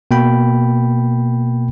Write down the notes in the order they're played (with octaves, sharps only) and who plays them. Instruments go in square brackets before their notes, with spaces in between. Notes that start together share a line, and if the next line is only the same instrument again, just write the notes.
[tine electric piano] B2 A#3 G5 B5